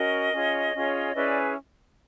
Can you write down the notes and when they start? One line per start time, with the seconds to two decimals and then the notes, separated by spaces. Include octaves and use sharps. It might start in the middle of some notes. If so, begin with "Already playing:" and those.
Already playing: C#4 F#4 A#4 D#5
0.33 C#4 F4 G#4 C#5
0.74 C#4 F4 G#4 C#5
1.15 C#4 E4 G#4 B4 D5